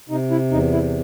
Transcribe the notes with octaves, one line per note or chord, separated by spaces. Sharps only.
C3 D#4
E4
E2 D#4
E4